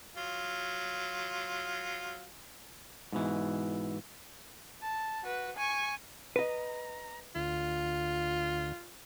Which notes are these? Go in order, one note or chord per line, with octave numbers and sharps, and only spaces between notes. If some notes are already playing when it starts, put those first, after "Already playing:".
F#3 F4
G#2 B2 E3
A5
F#4 B4
G#5 C#6
B4 D#5 A#5
D2 F4